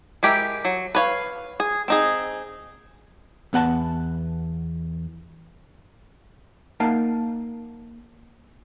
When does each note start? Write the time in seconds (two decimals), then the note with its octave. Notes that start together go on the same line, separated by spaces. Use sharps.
0.23 G#3 E4 G4 A#4 E5
0.65 F#3
0.95 B4 C#5 F5
1.60 G#4
1.88 C4 D#4 G#4
3.53 E2 B3 F#5 A5
6.80 A#3 D#4 A#4 F5 F#5 A5